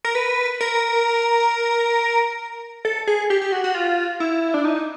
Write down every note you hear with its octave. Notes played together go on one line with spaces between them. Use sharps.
A#4
B4
A#4
A4
G#4
G4
G4
F#4
F#4
F4
E4
D4
D#4